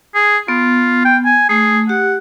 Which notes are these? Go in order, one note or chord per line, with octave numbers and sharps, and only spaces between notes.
G#4
B3 F4
G5
G#5
A3 G#4
G4 F#5